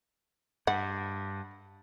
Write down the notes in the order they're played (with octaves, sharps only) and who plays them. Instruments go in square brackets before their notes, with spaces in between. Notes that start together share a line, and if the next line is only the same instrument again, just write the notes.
[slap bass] G2 [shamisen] F#5